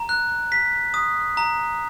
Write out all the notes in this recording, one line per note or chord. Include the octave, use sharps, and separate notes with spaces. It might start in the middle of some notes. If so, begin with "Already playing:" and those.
Already playing: A#5
F#6
B6
D#6
A#5